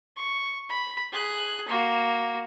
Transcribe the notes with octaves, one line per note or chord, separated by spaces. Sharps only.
C#6
B5
G#4 F#6
A#3 F#4